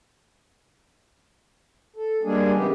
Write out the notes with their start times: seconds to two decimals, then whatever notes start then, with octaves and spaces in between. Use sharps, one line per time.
1.96 A4
2.23 G3 G#3 A#3 D4 G#4
2.54 C#3 E3 B3 G4